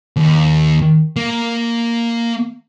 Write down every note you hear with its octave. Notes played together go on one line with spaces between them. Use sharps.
D#2
A#3